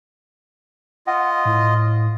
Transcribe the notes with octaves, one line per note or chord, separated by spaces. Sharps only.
F4 D#5 F#5
A2